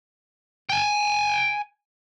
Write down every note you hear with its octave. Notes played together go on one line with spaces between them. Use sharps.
G5 G#5